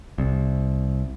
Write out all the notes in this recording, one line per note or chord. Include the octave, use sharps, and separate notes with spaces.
C2